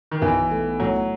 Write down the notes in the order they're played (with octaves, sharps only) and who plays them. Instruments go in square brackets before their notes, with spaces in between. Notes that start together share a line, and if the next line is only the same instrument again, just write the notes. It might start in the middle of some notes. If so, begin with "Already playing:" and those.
[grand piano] D#3
[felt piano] B1 [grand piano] E3
[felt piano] A3
[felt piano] A2 [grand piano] F#3